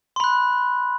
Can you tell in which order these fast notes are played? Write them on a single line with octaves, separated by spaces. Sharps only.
C6 B5 F#6